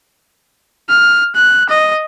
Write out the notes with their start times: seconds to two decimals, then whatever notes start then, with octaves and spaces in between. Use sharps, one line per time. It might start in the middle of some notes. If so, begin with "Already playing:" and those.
0.89 F6
1.35 F#6
1.69 D#5